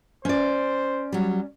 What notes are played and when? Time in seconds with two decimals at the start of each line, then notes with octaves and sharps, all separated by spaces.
0.25 C#4 C5 D5
1.12 F#3 G3